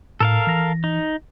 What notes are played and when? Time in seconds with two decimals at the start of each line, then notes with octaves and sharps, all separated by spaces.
0.20 A2 A4 A#4 F5
0.47 E3 A#6
0.84 D#4